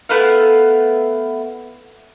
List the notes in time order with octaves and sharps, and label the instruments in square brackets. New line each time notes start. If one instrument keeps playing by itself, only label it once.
[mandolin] A3 B3 E4 F5